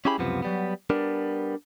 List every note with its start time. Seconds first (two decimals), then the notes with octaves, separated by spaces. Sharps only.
0.05 C#4 E4 G4 G#4 B5
0.18 C#2 F#2 C3 F3 B3
0.42 F#3 G3 B3
0.90 G3 B3 D4 A#4